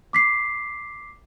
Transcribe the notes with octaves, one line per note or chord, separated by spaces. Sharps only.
D6 B6 C7